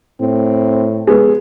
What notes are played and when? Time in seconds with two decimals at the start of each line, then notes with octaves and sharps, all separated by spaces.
0.21 A2 C4
1.07 G#3 B3